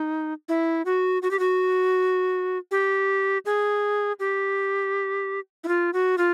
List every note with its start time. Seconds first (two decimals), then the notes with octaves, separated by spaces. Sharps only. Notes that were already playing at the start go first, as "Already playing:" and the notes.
Already playing: D#4
0.49 E4
0.85 F#4
1.22 F#4
1.31 G4
1.39 F#4
2.71 G4
3.46 G#4
4.20 G4
5.64 E4
5.68 F4
5.93 F#4
6.18 F4